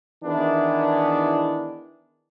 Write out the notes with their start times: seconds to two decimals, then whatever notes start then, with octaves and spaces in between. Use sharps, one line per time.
0.24 D#3 E3 B3 D4 E4 G#4